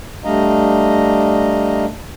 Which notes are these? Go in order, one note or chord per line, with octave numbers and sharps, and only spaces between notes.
G3 A3 D4 D#5 F5 A#5